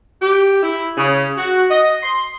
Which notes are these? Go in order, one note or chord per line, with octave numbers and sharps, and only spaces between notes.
G4
E4
C#3
F#4
D#5
C6